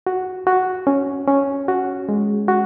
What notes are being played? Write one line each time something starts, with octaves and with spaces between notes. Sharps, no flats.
F#4
F#4
C#4
C#4
F#4
G#3
F#4